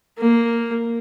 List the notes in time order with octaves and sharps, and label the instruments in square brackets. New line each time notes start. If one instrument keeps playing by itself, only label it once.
[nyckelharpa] A#3